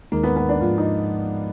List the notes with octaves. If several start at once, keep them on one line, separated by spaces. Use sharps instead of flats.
D#2 D#3 G#3 A#3 D#4
B3
B3
D4
G#2 F3 G#3 F4
D#4